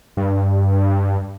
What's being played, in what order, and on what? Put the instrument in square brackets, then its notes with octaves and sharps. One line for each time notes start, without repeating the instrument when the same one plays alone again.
[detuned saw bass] G2